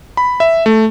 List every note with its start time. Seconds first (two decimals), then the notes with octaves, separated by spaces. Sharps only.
0.17 B5
0.40 E5
0.66 A3